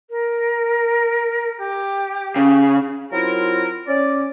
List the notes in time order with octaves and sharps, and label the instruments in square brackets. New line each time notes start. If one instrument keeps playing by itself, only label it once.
[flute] A#4
G4
[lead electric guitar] C#3
[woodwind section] F#3 C4 E4 F4 A#4
C#4 D5